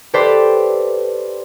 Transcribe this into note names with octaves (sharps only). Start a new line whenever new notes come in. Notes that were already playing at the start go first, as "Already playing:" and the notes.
G4 A4 B4 C5 D5